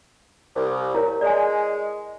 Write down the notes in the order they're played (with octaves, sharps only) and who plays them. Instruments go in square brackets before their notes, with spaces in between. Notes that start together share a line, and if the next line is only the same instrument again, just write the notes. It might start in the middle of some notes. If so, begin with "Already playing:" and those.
[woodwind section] C2
[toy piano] E4 A#4 C#5
[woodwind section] G#3 [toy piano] D5 G#5